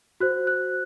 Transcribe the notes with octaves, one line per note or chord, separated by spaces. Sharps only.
F#4 C5 F#6
F#6